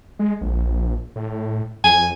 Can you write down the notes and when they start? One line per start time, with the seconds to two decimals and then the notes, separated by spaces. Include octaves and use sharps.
0.19 G#3
0.41 A#1
1.16 A2
1.84 F2 G#5